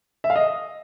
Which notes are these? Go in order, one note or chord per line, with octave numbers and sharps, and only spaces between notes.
E5
F5
D#5